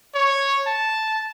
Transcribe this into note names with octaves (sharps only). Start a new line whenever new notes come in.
C#5
A5